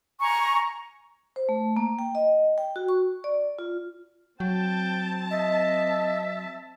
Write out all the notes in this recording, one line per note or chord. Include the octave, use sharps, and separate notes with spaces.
G#5 A#5 C#6
C5
A3
A#3
G5
D#5
G5
F#4
C#6
D5
F4
F#3 C4 G5 A5
D#5 E5